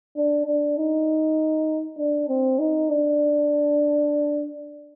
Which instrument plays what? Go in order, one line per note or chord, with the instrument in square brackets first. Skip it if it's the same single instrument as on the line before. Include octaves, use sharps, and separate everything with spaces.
[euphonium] D4
D4
D#4
D4
C4
D#4
D4